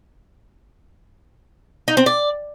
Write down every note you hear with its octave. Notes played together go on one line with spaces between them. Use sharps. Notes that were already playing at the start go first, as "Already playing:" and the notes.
D#4
C4
D5